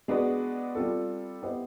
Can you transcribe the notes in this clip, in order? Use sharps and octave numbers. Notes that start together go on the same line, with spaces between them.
G#3 B3 D4 F#4 B4
G3 C4 F4 A4
B3 E4 G4 C5 D#5